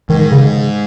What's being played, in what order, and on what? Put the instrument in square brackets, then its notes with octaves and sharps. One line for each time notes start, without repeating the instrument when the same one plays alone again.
[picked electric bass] G#2 [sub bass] D#3
[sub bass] C#3